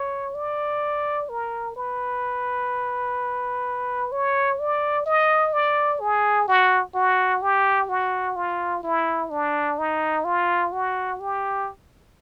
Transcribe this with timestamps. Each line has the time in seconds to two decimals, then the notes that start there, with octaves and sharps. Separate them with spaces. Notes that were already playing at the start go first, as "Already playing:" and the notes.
Already playing: C#5
0.35 D5
1.29 A#4
1.76 B4
4.12 C#5
4.60 D5
5.06 D#5
5.53 D5
6.01 G#4
6.48 F#4
6.95 F#4
7.42 G4
7.89 F#4
8.36 F4
8.84 E4
9.30 D4
9.79 D#4
10.25 F4
10.72 F#4
11.20 G4